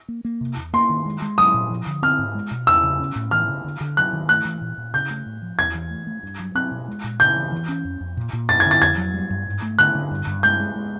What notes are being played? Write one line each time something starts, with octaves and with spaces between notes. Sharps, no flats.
A#3
A#3
C3
E2
A#3 C6
D#3
G#3
G#3
F#3 D#6
A#2
F3
D3
C4 F6
G#2
G#3
B2
E2 E6
C#3
C#4
A2
E3 F6
C#3
D3
D3
F#3 F#6
D#3
A3 F#6
E3
A#2
A#2
C#3 G6
A3
A2
F3
E2 G#6
E3
A3
A3
G2
F#3
C4 F#6
B2
G#3
A#2
C#3 G6
E3
E3
C#4
F2
F2
A#2
A#2
F#2 A6
G#6
D3
A6
F2 G#6
F#3
G3
G2
G#2
A3
D3 F#6
D3
G2
G2
G#3 G6
G#3
G#3